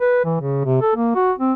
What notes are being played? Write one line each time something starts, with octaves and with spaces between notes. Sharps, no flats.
B4
E3
C#3
C3
A4
A#3
F#4
C4